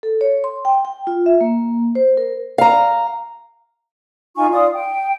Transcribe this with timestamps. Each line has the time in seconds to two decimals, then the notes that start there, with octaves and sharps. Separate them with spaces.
0.03 A4
0.21 C#5
0.44 C6
0.65 G5
0.85 G5
1.07 F4
1.26 E5
1.41 A#3
1.95 C5
2.17 A#4
2.58 F5 A#5
4.36 D#4 F4 G#5 C#6
4.53 F4 D5 F5 D#6
4.75 G5